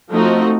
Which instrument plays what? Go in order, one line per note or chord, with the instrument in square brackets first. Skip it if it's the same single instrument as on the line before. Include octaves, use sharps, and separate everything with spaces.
[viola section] F3 A3 C4 D#4 F#4